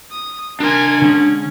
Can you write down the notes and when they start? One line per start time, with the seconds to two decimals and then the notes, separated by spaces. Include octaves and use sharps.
0.11 D#6
0.60 D4 A#4 G#5 C6
1.02 D3 G#3 C#4